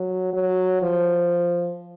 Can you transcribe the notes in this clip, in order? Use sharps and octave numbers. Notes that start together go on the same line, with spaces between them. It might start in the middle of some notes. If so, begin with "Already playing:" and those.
Already playing: F#3
F#3
F3